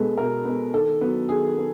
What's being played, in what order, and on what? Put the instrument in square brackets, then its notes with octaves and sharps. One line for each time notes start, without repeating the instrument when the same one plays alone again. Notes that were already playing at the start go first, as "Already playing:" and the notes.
Already playing: [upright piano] B2 G#3 B3 A4
B2 A#4
G#3 B3
D#3 A4
F#3 B3
D#3 G#4
B3